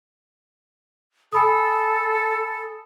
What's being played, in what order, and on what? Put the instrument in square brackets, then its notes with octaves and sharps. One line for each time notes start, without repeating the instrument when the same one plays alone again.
[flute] A4 [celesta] G#5 B5 D#6